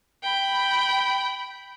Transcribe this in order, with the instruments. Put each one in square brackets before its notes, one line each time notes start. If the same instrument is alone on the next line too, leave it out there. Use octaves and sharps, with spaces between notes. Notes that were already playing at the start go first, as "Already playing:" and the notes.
[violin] G5 B5